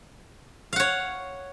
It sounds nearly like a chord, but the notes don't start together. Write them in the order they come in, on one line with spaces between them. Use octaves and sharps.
F5 F#5 C#5